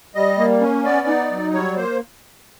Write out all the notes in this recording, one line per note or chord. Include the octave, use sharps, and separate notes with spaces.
G3 D#5
A#3
C#4
B3 D5
D#4
F#3
G3 C#5
A#3 C5